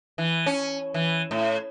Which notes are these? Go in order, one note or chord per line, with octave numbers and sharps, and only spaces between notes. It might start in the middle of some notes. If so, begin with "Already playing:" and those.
E3
C#4
E3
A2